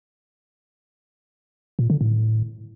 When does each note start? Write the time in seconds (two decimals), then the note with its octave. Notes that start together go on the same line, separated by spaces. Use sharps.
1.79 A#2
1.90 D3
2.01 A2